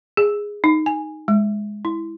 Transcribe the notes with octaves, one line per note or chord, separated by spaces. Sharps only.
G#4
D#4
G#5
G#3
E4